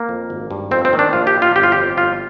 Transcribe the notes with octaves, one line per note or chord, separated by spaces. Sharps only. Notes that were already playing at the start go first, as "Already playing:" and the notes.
Already playing: A#3
F2
G#1
G2
F2 C4
C4
D#3
D4
A#1 F4
G4
A#2
F4
G1 G4
F4
F2 G4
G1 F4